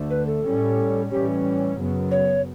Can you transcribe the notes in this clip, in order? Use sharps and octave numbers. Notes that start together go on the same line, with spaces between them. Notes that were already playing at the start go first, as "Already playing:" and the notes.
Already playing: D2 D3 A3
B4
A4
A2 G3 C#4
A2 E3 G3 C#4 G4
F#2 C#3 F#3 B3
C#5